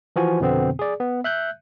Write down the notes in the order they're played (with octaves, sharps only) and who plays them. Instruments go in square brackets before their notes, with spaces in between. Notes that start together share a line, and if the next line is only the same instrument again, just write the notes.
[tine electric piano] E3 F3 F#4 G#5
F2 B2 D3 B3 C4
G#4 D5
B3
E5 F#6 G6